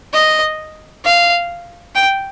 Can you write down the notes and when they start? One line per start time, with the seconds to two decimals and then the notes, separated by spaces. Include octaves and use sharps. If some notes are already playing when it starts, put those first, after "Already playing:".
0.14 D#5
1.05 F5
1.96 G5